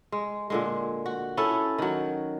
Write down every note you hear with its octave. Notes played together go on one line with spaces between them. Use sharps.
G#3
A#2 D3 G#3
F#4
C#4 E4 A4
D#3 F#3